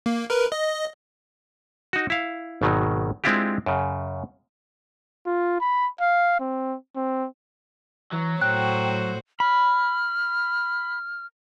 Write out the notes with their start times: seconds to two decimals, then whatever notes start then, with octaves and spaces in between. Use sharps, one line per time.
0.06 A#3
0.30 A#4 B4
0.52 D#5
1.93 D#4 F#4
2.10 E4 F5
2.62 G#1 B2 D#3 F#3
3.24 G#3 C4 D4 E4 F4 G4
3.66 F#2 C#3
5.26 F4
5.60 B5
6.01 F5
6.40 C4
6.96 C4
8.12 E3 F#3
8.41 A2 F#4 C5 G5 F#6
9.40 B5 F6